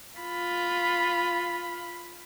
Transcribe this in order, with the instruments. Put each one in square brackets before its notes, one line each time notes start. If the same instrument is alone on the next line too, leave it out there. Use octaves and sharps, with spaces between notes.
[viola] F4 B5